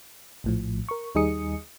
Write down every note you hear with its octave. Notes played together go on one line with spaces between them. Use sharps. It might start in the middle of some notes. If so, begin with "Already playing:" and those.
A#1 A2 F3
A#4 C#6
D#2 G3 D#4 G#4 D#6 C#7